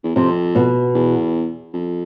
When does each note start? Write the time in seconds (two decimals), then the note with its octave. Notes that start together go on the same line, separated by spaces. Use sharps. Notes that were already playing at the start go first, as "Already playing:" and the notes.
0.03 E2
0.15 F2 C3
0.55 B2
0.94 E2
1.73 F2